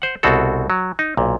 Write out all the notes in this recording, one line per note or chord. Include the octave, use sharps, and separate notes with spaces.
C5 F#5
C2 B2 C4 F#4 A4
F#3
D#4
B1 A#2